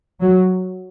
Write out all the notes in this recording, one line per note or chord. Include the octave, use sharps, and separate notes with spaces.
F#3